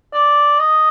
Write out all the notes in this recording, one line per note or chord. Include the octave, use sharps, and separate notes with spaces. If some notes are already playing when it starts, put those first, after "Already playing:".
D5
D#5